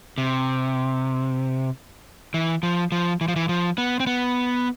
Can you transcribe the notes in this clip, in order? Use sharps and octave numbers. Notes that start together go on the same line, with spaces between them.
C3
E3
F3
F3
E3
F3
E3
F3
B3
C4
B3